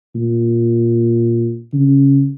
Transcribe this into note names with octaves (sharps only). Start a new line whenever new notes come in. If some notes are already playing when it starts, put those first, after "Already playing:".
A#2
C#3